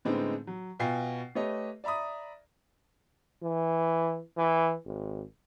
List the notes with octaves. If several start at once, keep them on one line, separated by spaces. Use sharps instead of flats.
A2 D3 G#3 B3 C4 D#4
F#3
B2 F4 G5 G#5 C7
A3 G4 B4 C#5 D#5
D5 E5 A#5 B5 D#6
E3
E3
G#1